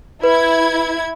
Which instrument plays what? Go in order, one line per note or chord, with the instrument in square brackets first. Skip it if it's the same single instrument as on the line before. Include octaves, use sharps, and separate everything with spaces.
[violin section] E4 G#6 [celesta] B4